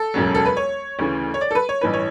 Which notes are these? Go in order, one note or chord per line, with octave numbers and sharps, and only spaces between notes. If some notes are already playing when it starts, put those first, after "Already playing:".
Already playing: A4
E1 D2 C#3 F#3
A4
B4
C#5
D2 C#3 E3
C#5
D5
A4
B4
C#5
A1 G2 E3 B4
C#5